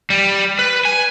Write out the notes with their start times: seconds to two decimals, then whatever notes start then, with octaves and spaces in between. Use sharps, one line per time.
0.10 G3
0.59 B4
0.85 G#5